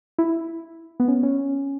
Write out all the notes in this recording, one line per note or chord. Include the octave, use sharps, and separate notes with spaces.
E4
B3
C#4
C#4